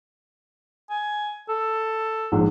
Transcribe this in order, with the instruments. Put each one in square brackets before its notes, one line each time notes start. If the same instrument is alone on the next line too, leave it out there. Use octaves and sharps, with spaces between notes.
[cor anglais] G#5
A4
[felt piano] A#1 G#2